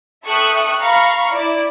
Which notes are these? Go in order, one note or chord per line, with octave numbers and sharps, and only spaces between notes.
A4 E5 G5 C#6 D#6 F#6
F5 A#5 B5 C#6 F6
E4 D5